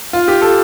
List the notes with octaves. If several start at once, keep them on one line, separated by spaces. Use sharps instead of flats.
F4
G4
A4